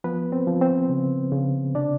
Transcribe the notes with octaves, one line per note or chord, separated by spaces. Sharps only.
F3 B3 B4
C4 C5
F3
C4 C5
C#3
C#3
C3 D4 D5